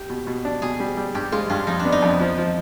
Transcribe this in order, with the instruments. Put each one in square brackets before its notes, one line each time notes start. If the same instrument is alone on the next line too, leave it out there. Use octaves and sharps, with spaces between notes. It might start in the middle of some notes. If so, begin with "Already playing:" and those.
Already playing: [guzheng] G4
[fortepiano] B2
B2
D4
[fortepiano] B2 [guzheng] G#4
[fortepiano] G3
G3
[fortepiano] G2 [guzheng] G4
[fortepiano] G#3 [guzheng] F4
[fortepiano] G2 [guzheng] F4
[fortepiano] F2 [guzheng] D#4
[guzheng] D4
[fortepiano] B3
[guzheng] D#4
[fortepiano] F2
F3
F3